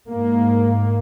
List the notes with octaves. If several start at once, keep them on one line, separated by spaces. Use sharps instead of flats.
G#2 A#3